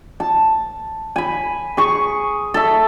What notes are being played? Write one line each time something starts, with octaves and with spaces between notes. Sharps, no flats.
A5
G#5 B5
G#4 C#6
A4 E5